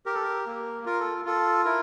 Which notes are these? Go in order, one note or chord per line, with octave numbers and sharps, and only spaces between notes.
G4 A#4
A4
A#4
A#3
F4 A#4
A4
F4 A4
E4 A#4